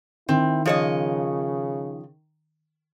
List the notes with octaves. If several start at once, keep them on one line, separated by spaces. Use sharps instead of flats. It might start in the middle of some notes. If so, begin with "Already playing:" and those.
D#3 C4 E4
C#3 F3 C#5 D#5